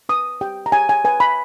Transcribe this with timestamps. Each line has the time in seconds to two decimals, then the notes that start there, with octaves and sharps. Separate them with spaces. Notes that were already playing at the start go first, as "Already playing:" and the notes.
0.09 B4 D#6
0.41 G4 G5
0.66 A#5
0.72 G4 G#5
0.89 G#5
1.04 B4 G#5
1.20 B5